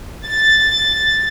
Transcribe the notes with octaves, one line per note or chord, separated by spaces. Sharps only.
A6